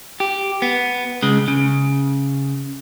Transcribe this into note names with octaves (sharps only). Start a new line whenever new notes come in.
G4
B3
C#3 G#3
C#3